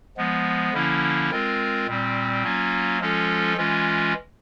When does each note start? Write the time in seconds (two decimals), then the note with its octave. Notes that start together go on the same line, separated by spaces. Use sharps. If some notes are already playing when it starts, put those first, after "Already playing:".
0.17 F3 G#3 B3
0.74 D3 F3 A#3 C#4 E4
1.30 G#3 C4 F4 A#4
1.86 A#2 G3 C4
2.43 F#3 A#3 C#4 F4
3.00 F3 G#3 C#4 F4 A4
3.57 E3 G#3 C#4 F4